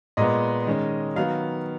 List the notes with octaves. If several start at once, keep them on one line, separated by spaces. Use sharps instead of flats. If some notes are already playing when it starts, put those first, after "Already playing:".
A#2 G#3 B3 D#5
D#3 G#3 C#4
D#3 F#3 B3 F5